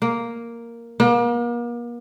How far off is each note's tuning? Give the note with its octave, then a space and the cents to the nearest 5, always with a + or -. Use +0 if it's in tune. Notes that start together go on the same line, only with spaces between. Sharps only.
A#3 +0
A#3 +40